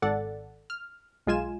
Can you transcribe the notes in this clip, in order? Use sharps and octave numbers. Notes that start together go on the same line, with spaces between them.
G#1 A4 D5 F#5 A6
F6
B1 G#3 F4 G#5 E7